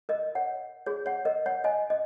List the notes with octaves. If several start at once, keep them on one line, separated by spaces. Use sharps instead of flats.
A#4 D#5
C#5 F#5
G#4 C#5
C#5 F#5
A#4 D#5
C#5 F#5
D#5 G#5
D#5